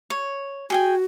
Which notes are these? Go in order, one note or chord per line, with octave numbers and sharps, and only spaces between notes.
C#5
F#4 G#4 G5 G#5